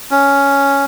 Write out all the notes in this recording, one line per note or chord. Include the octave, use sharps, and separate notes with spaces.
C#4